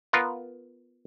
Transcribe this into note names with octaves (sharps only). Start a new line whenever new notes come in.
B3 F4 A#4